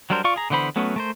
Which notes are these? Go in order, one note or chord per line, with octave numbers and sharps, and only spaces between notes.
F#3 G3 D4 A#4 C5
F4 D5 F5 C#6
G#4 A#5
D3 E3 B3 C5 B5
F#3 A3 B3 C#4
A3 A#4 C5